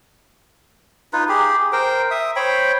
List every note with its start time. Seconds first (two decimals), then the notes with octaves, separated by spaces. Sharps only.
1.13 D#4 F4 B4
1.29 G4 G#4
1.73 A#4 C5 G5
2.11 E5 D#6
2.36 C5 C#5 G5 B5